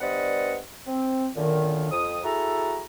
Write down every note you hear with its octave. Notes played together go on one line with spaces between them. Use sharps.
G2 B3 C5 D5 D#5 F#5
C4
F#2 A#2 D3 D#3
F2 D#6
E4 F#4 G#4 A4 A#5